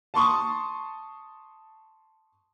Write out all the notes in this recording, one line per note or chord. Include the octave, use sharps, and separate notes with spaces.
A5 C6 C#6 D#6